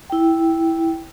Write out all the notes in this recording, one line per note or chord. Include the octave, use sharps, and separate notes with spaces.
E4 G5